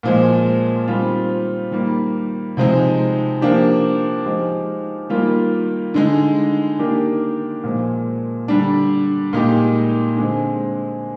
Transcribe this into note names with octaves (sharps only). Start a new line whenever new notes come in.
A#2 F3 G#3
D#3 G3 C4 F4
D#3 G3 A#3
C3 F3 G#3 D#4
F3 A#3 D4 G4
F3 G#3 D#4 G4
D#3 G3 A#3 F4
D3 G#3 D#4
D#3 A#3 D4 G4
A#2 F3 G#3
D3 G3 D4
A#2 G#3 D#4 G4
D3 G#3 C4